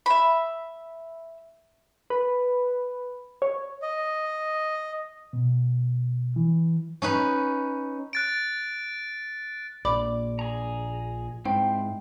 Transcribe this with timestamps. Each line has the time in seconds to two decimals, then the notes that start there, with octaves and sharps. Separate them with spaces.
0.06 E5 B5
2.10 B4
3.42 C#5
3.82 D#5
5.33 B2
6.36 E3
7.02 C#4 D#4 B4
8.13 F#6 A6 D7
9.85 A#1 D5 B5 D6
10.39 G#4 A#5
11.45 G#2 C4 E4 C5 G5